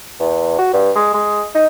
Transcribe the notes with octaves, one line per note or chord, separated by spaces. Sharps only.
E2
F#4
G2
G#3
G#3
D#4